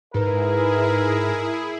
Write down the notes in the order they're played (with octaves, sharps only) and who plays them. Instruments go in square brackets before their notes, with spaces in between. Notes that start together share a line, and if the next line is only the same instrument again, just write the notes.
[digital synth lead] G#2 [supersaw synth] E4 G#4 [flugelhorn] A#4 [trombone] B4